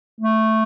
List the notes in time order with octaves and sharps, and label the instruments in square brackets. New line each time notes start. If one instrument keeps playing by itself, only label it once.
[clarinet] A3